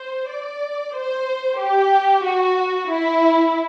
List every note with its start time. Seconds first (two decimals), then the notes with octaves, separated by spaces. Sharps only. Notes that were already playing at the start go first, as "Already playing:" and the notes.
Already playing: C5
0.30 D5
0.95 C5
1.60 G4
2.25 F#4
2.90 E4